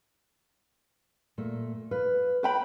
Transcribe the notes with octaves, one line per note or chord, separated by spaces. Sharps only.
A#2 A3
B4 F5
B4 G5 B5